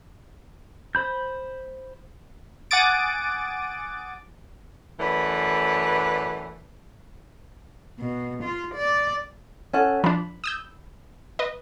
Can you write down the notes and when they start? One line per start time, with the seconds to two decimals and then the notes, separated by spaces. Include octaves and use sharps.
0.95 C5 B5 G6
2.71 F#5 G#5 D6 D#6 A6 D7
5.00 F#2 E3 A3 B4 C#5 D5
7.99 B2
8.43 F4
8.75 D5
9.73 C#4 A4 F#5
10.04 F3 D4 B5
10.44 D#6 E6 G6
11.39 B4 D#5